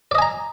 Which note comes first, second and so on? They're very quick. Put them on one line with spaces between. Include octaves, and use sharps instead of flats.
D5 D#5 G#5 A#5